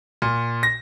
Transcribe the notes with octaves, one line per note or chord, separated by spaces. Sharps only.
A#2
A#6